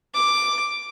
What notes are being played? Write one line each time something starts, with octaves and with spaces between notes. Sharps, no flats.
D6